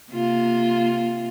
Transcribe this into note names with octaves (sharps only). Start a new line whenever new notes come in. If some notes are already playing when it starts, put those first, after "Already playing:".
C3 A#3 F4